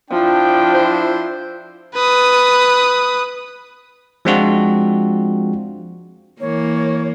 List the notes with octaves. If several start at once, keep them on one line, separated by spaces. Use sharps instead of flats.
F3 D4 E4 G5
C5
B4 D#6
F3 G#3 C4 D4 F4 F#4
E3 A#3 C#5